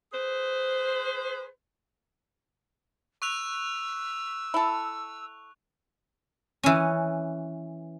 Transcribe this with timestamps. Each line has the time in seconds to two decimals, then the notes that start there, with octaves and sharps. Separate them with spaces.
0.12 G#4 B4 C5
3.22 C#6 E6 F#6 F7
4.54 E4 A4
6.63 E3 C#4